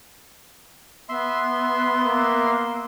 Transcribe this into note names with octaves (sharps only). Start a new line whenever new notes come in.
B3 E5 C6
A#3